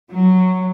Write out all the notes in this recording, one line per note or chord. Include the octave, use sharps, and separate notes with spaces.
F#3